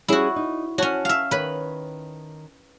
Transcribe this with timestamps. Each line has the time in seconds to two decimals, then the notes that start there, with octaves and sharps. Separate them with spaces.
0.08 G3 C#4 E4 F#4 G#4
0.36 D#4
0.78 C#4 F#4 C#5 A5
1.05 E5 F5
1.31 D#3 B4 C#5 B5